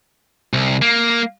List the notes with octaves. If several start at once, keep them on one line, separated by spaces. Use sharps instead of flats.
C2
A#3